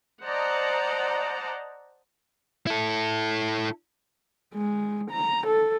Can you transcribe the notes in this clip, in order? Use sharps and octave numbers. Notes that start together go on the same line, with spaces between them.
C5 D5 D#5 F#5 A5 A#5
E4 A4
G#3
A#5
A4